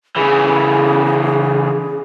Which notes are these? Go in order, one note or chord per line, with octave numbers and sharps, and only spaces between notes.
C#3 E3 G#4